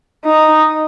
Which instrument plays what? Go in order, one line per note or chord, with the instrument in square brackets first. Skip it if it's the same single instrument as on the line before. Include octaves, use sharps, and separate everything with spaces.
[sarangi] D#4